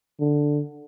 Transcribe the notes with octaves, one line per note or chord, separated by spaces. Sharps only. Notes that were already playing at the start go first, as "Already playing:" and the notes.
D3